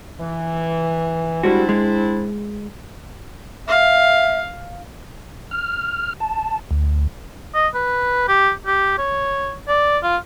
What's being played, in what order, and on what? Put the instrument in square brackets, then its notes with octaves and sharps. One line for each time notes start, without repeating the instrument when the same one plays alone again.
[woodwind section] E3
[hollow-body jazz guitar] G3 G#3 F#4 [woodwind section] C4 D4 E4
[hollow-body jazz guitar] G#3
[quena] E5 [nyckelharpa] F5
[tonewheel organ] F6
A5
D2
[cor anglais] D#5
B4
G4
G4
C#5
D5
F4